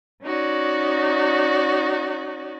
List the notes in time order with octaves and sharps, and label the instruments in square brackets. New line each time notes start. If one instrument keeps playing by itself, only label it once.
[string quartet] C#4 D#4 F#4 D5